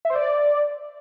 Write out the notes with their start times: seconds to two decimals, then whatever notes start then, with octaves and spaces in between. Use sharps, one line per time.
0.05 E5
0.10 C5
0.15 D5